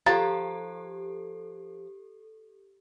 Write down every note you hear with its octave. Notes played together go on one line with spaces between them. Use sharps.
F3 G4 A4 A#5 A6